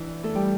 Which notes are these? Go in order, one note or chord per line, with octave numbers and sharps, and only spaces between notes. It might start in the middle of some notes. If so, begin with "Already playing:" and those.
Already playing: E3 D4 E4
A3 A4
G3 G4